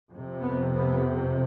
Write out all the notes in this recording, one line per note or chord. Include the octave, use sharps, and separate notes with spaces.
F2 C3
B3
B3